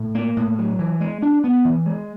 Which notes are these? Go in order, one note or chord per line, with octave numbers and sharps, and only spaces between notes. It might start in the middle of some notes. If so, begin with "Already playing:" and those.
Already playing: A2
A#3
A2
F#3
E3
G#3
D4
B3
E3
G#3